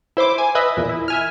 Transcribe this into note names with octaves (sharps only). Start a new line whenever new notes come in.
E4 C5 E5 D6
G#5
B4 D#5 E5
E2 A#2
E4
E5 G#5 F6